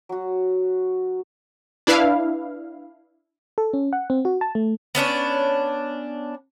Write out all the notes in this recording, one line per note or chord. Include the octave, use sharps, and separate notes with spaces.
F#3 F#4
D4 E4 B4 F5
A4
C#4
F#5
C4
F#4
A5
A3
B3 C#4 D4 C#5